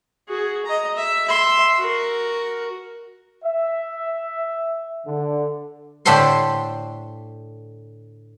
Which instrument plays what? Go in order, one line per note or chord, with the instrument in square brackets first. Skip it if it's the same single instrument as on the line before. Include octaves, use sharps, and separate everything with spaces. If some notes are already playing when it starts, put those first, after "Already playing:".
[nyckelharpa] F#4 G#4
D#5 A#5
E5
E5 C6
F#4 A#4
[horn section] E5
D3
[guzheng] A2 D3 G4 A4 C5 C6